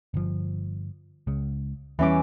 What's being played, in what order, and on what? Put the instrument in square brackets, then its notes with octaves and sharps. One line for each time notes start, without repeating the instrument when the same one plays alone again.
[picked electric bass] G1 F3
C#2 C#3
[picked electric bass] E2 G3 [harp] E3 C#4 D6